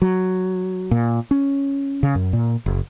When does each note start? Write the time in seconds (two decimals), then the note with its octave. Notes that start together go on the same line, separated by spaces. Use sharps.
0.02 F#3
0.91 A#2
1.31 C#4
2.03 C#3
2.15 F#2
2.33 A#2
2.66 F#1